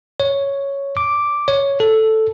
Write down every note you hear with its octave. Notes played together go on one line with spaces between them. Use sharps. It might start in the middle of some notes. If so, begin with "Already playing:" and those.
C#5
D6
C#5
A4